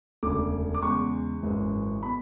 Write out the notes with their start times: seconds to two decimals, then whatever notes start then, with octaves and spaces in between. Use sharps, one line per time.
0.23 E1 D2 C#3 D6
0.74 D6
0.82 E2 C#3 G#3 C#6
1.43 G#1 F#2 E3 G#3
2.03 B2 B5